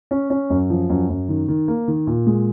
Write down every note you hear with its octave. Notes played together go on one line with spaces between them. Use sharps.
C#4
C#4
F#2
F3
F#2
F#2
D#3
D#3
A#3
D#3
A#2
G#3